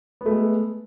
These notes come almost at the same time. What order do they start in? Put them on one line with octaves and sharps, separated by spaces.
B3 A3 G#3